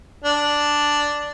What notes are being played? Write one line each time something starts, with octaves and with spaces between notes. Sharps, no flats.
D4